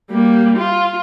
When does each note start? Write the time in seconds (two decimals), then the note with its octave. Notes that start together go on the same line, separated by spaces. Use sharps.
0.11 G3 A#3
0.58 F4